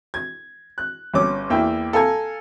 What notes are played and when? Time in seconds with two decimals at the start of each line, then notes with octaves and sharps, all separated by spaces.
0.14 G#6
0.78 F#6
1.14 G1 C#4 D6
1.50 E2 A#3 E4 G5
1.93 A4 F5 G#5 A#5 G#6